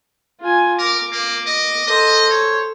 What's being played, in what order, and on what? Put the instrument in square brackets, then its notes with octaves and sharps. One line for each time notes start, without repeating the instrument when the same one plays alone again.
[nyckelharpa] F4 G#5
[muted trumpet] A#4 [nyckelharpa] D6
[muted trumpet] A#3
D#5
[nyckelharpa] A4 C5 [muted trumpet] D#5
[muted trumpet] C#5